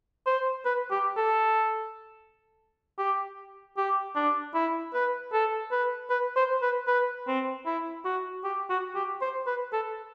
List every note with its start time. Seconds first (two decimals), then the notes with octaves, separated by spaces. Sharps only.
0.26 C5
0.65 B4
0.91 G4
1.17 A4
2.98 G4
3.77 G4
4.16 D4
4.54 E4
4.94 B4
5.33 A4
5.71 B4
6.10 B4
6.36 C5
6.62 B4
6.87 B4
7.28 C4
7.66 E4
8.05 F#4
8.44 G4
8.70 F#4
8.95 G4
9.21 C5
9.47 B4
9.73 A4